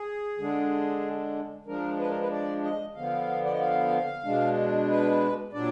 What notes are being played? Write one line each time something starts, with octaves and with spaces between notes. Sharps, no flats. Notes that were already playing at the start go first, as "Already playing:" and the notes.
Already playing: G#4
D3 G#3 D4
F3 G#3 D4 A#4
B4
A#4
B4
D5
D#5
D3 F3 B3 F5
D5
D#5
F5
B2 G#3 D4
B4
A#2 F#3 D4 D5